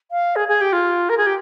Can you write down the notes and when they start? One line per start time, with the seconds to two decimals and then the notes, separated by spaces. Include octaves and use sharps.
0.11 F5
0.36 G#4
0.48 G#4
0.61 G4
0.72 F4
1.09 A#4
1.17 G#4
1.26 G4